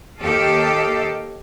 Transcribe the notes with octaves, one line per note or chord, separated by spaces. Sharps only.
D#2 G4 A4 D#5 F5